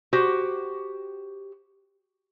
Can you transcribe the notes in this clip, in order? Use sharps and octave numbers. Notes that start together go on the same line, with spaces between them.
F#4 G4 C5